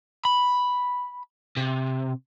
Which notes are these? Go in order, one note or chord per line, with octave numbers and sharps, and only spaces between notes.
B5
C3